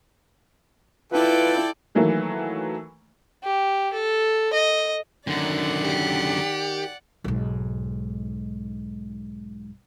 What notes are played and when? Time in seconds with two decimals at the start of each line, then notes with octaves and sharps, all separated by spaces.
1.12 E4 F4 A4 B4 D5 G5
1.95 D#3 E3 F#3 A3 A#3
3.43 G4
3.93 A4
4.53 D#5
5.27 F#2 D3 D#3 D5 F#5
5.85 G4
7.24 B1 G#2